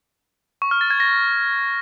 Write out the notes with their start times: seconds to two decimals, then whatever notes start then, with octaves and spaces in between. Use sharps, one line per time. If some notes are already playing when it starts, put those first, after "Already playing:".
0.62 C#6
0.71 F6
0.81 A6
0.90 G#6
1.00 A#6